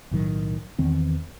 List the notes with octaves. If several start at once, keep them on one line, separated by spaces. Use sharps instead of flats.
B1 A2 D#3 F#3
E2 D#3 E3 C4